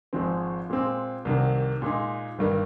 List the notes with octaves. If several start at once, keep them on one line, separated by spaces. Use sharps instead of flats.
G#1 G#2 F3 G#3 C4
A#2 G#3 C4
C2 C3 D#3 A#3
A#2 G#3 D#4
G1 G2 D#3 A#3